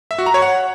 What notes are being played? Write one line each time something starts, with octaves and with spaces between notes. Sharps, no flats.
E5
F#4
A#5
C#5
F#5